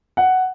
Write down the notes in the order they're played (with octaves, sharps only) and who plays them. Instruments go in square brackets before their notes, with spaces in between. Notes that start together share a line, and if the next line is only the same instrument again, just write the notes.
[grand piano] F#5